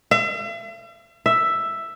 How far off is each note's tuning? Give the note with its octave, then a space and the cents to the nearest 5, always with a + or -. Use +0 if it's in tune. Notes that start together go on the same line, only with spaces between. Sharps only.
E5 +45
E5 +5